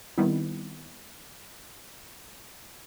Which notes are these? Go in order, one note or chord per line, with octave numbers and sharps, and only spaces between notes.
D#3 G3 B3 C4 E4